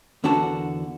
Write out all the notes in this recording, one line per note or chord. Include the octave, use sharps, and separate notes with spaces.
E2 D3 D4 F#4 A#4 A5